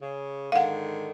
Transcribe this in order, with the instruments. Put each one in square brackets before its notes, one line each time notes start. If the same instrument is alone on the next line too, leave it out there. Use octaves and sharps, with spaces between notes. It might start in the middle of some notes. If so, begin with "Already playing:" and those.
[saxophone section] C#3
[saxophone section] G#2 D3 D#3 [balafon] F5 F#5